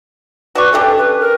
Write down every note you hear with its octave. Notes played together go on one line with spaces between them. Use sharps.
F#4 B4 D5 C#6
C#4 D4 G4 A4
B4
A#4